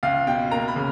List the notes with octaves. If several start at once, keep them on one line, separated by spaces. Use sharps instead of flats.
C#2 F5
B2 G5
A#3 A#5
B5
C#3